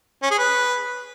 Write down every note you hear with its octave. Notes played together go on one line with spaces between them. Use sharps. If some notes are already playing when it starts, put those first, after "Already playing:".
C#4
G#4
B4